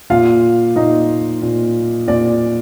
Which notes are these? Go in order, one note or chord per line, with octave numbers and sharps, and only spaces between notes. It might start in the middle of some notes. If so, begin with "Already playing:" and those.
A#2 F4 F5
A#2 D#4 D#5
A#2
A#2 D5